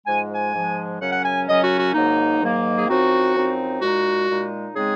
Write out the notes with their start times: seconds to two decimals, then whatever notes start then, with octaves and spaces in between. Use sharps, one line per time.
0.06 G#2 F3 G#3 G#5
0.33 G#5
0.53 G#2 F3 G#3
1.00 F#2 C#3 F#3 C#4 F#5
1.12 F#5
1.24 G#5
1.47 F#2 C#3 F#3 C#4 D#5
1.63 F#4
1.78 F#4
1.93 G#2 D#3 F#3 A#3 D#4
2.41 G#2 D#3 F#3 A#3 D#4
2.78 G#4
2.88 F#2 F3 C4 D#4 F#4
3.34 F#2 F3 C4 D#4
3.81 A#2 G#3 D#4 F#4
4.27 A#2 G#3 D#4
4.74 C#3 G#3 C4 D#4 G#4